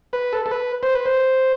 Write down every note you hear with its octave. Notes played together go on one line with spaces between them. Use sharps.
B4
A4
A4
B4
C5
B4
C5